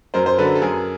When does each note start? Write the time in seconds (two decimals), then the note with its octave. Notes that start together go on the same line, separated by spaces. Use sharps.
0.14 F#2 A#4 C5
0.26 C5
0.38 D3 F#3 A4 B4
0.55 A4
0.61 F#2 G#4 A#4